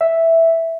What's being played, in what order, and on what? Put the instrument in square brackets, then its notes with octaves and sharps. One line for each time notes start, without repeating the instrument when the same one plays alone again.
[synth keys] E5